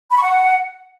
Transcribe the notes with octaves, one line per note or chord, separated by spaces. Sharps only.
B5
C#6
F#5